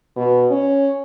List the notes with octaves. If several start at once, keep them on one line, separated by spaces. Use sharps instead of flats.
B2
C#4